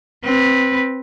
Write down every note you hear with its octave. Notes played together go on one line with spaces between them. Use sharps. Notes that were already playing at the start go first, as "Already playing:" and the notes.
C4 B4